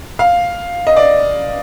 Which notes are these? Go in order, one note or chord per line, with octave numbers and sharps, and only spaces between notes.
F5
D#5
D5